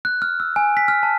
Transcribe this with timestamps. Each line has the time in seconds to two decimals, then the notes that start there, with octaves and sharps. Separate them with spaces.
0.05 F#6
0.22 F6
0.40 E6
0.56 G#5
0.77 B6
0.88 F6
1.03 A5